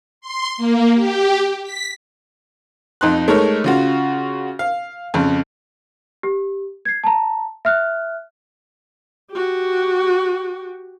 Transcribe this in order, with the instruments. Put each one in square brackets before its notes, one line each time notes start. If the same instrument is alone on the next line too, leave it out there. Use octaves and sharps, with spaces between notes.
[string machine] C6
A#3
G4
B6
[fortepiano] F2 D#4 C6 F#6
G#3 A3 D#4 A#4 C#5
C#3 F4 F#4
F5
F2 C#3
[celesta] G4
G#6 C7
A5 A#5
E5 F6 F#6
[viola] F#4 G4